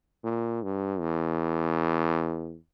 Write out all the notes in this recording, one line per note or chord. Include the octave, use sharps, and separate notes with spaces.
A#2
G2
E2